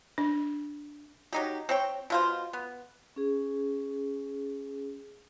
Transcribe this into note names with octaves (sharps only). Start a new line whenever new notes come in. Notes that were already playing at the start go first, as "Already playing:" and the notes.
D4
F#3 D#4 G4
C4 C#5 G5
B2 F4 C5
B3
C#4 G#4